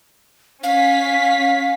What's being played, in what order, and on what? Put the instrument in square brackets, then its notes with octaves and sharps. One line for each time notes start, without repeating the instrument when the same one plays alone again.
[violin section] C#4 B6 [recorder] F5